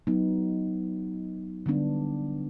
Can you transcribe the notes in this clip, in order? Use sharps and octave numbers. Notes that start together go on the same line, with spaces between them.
F#3 B3 D#4
D3 G3 B3 D4